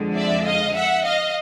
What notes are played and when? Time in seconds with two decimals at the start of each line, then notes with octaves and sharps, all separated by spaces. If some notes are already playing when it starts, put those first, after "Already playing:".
Already playing: F2 D3 F3 G#3
0.16 D5 E5
0.46 D#5 F5
0.76 E5 F#5
1.05 D#5 F5